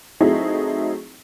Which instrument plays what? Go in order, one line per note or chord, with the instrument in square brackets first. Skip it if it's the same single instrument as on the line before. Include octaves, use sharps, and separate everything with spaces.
[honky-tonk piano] F#3 A3 C4 D#4 E4 G#4